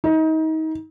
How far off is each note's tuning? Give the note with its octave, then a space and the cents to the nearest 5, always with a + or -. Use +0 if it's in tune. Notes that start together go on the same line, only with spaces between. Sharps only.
D#4 +30